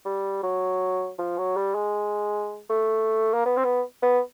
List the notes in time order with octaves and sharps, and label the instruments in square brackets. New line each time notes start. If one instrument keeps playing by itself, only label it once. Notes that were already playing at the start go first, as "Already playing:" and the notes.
[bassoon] G3
F#3
F3
F#3
G3
G#3
A3
A#3
B3
C4
B3
B3